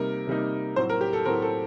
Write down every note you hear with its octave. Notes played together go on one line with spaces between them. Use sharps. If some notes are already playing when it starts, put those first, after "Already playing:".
Already playing: C3 G3 A#3 D#4 A#4
C3 G3 A#3 D#4
A2 F#3 C4 C5
A#4
G4
A4
A2 F#3 C4 A#4
A4